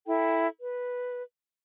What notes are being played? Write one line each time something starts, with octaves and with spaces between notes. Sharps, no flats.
E4 A4 G5
B4